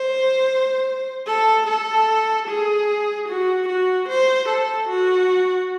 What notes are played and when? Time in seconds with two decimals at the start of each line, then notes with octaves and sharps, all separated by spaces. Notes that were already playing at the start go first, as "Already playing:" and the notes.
Already playing: C5
1.27 A4
1.67 A4
2.47 G#4
3.28 F#4
3.68 F#4
4.09 C5
4.49 A4
4.89 F#4